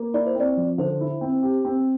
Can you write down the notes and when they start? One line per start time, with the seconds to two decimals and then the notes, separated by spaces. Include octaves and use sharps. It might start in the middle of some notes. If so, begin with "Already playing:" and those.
Already playing: A#3
0.14 E4 D5
0.26 C5
0.35 C4 D5
0.57 F3
0.78 D3 C5
1.01 E4
1.21 C4
1.43 G4
1.65 C4